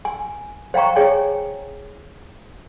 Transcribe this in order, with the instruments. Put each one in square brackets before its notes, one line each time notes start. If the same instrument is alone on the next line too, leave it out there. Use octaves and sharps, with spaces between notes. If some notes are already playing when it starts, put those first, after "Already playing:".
[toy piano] G#5
C5 F5 G5 A#5 C#6
G#4 C#5 G5 G#5